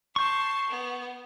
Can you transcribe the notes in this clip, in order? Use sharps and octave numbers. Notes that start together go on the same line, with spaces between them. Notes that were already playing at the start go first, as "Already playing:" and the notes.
A5 C6 C#6 G6
B3